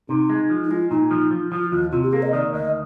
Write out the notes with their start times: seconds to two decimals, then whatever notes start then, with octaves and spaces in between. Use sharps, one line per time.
0.09 C3 D#4
0.30 G#3
0.50 F3
0.64 D#4
0.71 G#3 F4
0.90 A#2 D#4
1.11 F3
1.31 F3
1.52 F3 F4
1.72 D#2 F4
1.92 C3 F4
2.03 G4
2.13 A#3 G#4
2.22 D#5
2.33 D#3 D5
2.53 D2 D#5